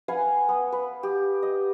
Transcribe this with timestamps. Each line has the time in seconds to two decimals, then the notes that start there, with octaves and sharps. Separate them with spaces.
0.08 B4 F5 F#5 G#5
0.49 B3
0.72 B4
1.03 G4
1.43 D#5